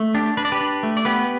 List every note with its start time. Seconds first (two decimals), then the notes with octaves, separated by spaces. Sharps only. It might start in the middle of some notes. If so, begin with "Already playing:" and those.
Already playing: A3
0.14 D4 G4
0.37 D4 B4
0.45 D5
0.52 G4 B4
0.61 D4
0.83 A3
0.97 D5
1.05 B3 G4 B4